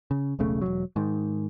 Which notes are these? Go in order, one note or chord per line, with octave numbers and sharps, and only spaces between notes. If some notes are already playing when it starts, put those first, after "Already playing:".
C#3
E1 B1 C#3 A3
E1 B1 F#3
G#2 D#3